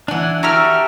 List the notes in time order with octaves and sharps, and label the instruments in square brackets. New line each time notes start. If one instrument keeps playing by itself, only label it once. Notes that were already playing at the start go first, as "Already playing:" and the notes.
[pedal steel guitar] E3 D4 [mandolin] F#5 G#5
[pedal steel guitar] F#4 G4 A4 [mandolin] A#4 E5 F6